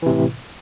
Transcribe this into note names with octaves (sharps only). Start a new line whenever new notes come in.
A2 C3 E3